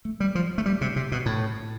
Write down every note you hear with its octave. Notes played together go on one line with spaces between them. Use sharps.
A3
G3
F3
A3
G3
C3
C3
B2
A2